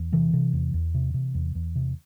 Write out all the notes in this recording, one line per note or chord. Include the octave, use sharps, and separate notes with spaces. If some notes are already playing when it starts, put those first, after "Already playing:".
Already playing: E2
C3 E3
C3
E2
E2
C3
C3
E2
E2
C3